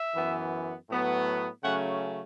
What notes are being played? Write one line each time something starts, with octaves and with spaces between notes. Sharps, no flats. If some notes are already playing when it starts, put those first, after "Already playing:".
Already playing: E5
F#2 E3 B3
A2 F#3 B3
C#3 F#3 A3 C#4 F#5